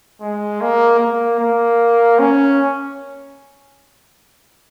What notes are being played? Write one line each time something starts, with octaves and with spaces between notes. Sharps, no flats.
G#3
A#3
A#3
A#3
C#4